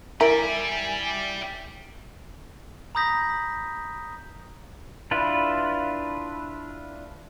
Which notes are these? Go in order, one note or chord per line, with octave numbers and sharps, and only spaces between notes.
E4 G4 A#4 D5 G#5
A#5 B5 D#6 G6 A#6 B6
D4 E4 F4 B4